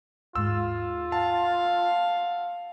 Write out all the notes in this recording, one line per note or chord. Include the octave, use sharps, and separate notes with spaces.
D#2 G#2 G#3 F4 E6
F5 F#5 A5